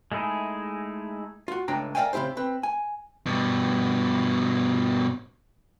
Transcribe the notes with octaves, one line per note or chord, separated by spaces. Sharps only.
G#3 A3 D#4 E4 G#4
F4 F#4
C#2 A2 D4 G5 A#5
A#4 D5 E5 F5 G5 G#5
C#3 C4 E4 G4 C5
C4 B4
G#5
G2 B2